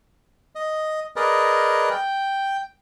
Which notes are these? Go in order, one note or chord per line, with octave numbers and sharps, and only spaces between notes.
D#5
G#4 A#4 B4 D5 D#5
G5